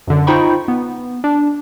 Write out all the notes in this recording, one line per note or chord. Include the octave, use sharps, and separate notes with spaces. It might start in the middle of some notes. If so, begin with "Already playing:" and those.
F#2 D3
D#4 F4 C5 G5 B5 C#6
B3
D4